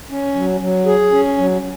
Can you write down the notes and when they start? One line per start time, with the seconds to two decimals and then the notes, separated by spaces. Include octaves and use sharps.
0.11 C#4
0.35 F#3
0.61 F#3
0.86 G#4
1.11 C#4
1.37 F#3